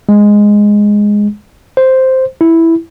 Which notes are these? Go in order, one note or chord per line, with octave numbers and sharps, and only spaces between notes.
G#3
C5
E4